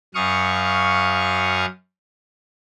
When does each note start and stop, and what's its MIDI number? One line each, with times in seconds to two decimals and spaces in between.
0.15 1.66 42
0.15 1.66 77
0.15 1.66 85
0.15 1.66 87